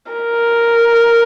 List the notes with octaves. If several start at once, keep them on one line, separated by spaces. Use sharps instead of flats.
A#4